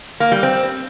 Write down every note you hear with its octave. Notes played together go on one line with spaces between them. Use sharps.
A#3
G3
C4